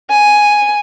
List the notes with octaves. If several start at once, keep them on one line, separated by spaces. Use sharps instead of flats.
G#5